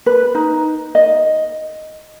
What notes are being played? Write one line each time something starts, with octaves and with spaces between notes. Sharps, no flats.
B4
D#4
D#5